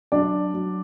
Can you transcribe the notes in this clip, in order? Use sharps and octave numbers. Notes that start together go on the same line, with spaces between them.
F#3 D4 D5
F#3